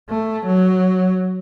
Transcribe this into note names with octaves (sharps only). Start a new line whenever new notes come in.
A3
F#3